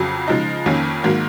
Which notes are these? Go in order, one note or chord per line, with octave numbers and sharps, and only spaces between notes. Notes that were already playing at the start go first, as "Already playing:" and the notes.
Already playing: F2 C#3 F#3
C#3 F3 G#3 D#4
F2 D#3 A#3 C#4
G#2 D#3 F#3 A#3